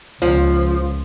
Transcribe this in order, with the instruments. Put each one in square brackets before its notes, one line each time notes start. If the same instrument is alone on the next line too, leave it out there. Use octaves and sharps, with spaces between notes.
[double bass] C#2 [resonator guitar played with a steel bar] F3